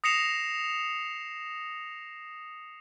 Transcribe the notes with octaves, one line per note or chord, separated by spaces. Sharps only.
D#6 A#6 C7 C#7 E7 F7